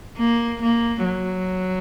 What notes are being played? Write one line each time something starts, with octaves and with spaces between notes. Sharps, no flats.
A#3
A#3
F#3